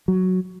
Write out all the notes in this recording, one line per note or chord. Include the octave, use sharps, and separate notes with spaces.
F#3